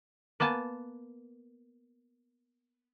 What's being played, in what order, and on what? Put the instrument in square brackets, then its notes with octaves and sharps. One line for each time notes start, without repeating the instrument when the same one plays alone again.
[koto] A#3 B3 G#5 A5